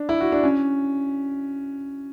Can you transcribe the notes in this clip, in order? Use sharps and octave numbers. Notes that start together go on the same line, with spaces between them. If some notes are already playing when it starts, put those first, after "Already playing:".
Already playing: D4
E4
F#4
D4
C#4